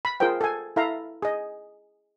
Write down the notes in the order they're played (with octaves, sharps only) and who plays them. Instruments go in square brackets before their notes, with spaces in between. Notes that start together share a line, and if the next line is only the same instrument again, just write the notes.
[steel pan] B5
F4 G#4 A#4 C5 G5
A4 G#5
E4 A4 E5 F5 A#5
G#4 D#5